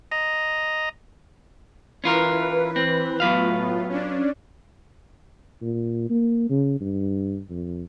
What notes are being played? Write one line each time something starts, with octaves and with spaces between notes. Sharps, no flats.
D#5 A#5
E3 C#4 F4 A#4 B4
C4
A2 F#3 B3 F4 B4 F5
C#4 D4
A#2
A#3
C#3
G2
F2